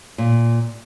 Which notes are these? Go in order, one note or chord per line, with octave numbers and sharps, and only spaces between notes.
A#2